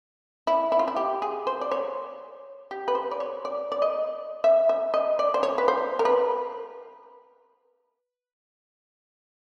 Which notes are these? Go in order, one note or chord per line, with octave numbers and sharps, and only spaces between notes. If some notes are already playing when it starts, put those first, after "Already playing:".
E4
E4
F4
E4
G4
G#4
C5
D5
C#5
G4
B4
C5
D5
C#5
D5
D5
D#5
E5
E5
D#5
D5
C5
C#5
B4
C5
A#4
B4